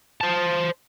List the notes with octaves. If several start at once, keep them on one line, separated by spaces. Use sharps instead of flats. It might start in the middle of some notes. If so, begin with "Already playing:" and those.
C5 A5